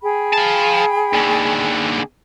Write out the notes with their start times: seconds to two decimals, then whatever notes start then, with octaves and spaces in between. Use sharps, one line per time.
0.02 G#4 G5 B5
0.33 F5 A5
1.13 D#2 D3